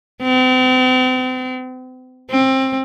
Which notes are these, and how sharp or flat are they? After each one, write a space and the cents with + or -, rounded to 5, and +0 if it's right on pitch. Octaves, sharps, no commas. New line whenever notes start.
C4 -40
C4 +20